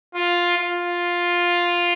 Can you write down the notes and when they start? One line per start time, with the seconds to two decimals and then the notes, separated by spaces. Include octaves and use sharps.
0.15 F4
0.57 F4